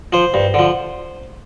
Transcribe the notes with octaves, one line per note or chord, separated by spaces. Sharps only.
F3 C5
G2
D3 F3